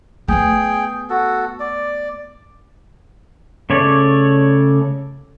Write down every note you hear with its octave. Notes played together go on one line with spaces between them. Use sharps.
A3 B3 G#4 G5
F#4 A4
D5
C#3 A3 C#5 D5